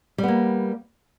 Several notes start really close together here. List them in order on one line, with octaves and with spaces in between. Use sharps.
G3 B3 A#3